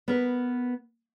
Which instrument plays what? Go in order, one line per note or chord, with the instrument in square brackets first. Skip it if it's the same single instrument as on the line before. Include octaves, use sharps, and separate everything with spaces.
[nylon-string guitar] B3 A#4 B4